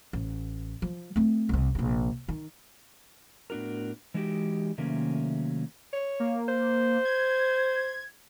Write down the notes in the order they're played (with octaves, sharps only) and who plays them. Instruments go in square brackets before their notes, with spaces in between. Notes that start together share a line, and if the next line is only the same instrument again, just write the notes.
[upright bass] A1
F3
A3 C4
C2 C3
A#1 C3
D#3
[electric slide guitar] A2 B3 D4 F#4 A#4
E3 G#3 D#4 F#4 G4
C3 D#3 F#3 A3 A#3 C#4
[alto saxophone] C#5
[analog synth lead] A#3
[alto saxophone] C5
[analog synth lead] G#6